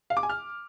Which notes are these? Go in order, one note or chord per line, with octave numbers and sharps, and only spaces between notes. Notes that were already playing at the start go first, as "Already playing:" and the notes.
F5
D6
G#5
F6